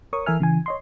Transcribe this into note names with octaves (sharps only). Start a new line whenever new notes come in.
A#4 C#5 C#6 D#6
E3 A4 A#4 E5 G#5 F6
C#3 E3 G#5
C#5 D#5 C6